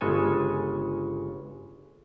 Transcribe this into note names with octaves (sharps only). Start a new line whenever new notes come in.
G1 C#3 G#3 A4 G#5